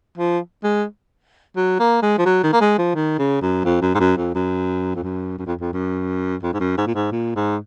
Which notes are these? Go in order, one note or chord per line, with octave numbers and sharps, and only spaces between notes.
F3
G#3
F#3
A#3
G#3
F3
F#3
D#3
A#3
G#3
F3
D#3
C#3
F#2
F2
F#2
G#2
F#2
F2
F#2
F2
F#2
F#2
F2
F2
F#2
F2
G#2
F#2
G#2
A#2
G#2
A#2
G#2